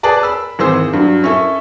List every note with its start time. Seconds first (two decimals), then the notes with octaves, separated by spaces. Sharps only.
0.03 G#4 B4 D5 A5
0.23 B5 E6
0.59 G#1 E3 G#4 C5 E6
0.93 G2 F#3
1.24 C#4 E4 A4